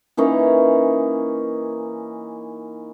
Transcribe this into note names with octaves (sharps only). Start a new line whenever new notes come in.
E3 A#3 C#4 D#4